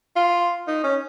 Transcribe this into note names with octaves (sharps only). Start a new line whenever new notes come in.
F4
D#4
C#4